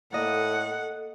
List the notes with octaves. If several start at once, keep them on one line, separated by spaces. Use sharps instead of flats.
A2 A#3 A4 D#5 F#5